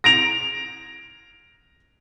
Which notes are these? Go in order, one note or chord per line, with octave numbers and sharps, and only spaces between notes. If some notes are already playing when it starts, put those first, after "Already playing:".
A#6 D7 F7